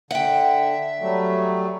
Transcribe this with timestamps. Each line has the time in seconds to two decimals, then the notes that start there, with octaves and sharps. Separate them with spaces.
0.11 D3 E5 F#5 G5
1.00 F#3 G3 A3